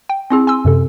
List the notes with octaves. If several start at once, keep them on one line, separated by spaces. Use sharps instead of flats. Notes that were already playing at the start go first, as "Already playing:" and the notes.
G5
C4 E4 G#4
G#5 C6 E6
F#2 C3 A4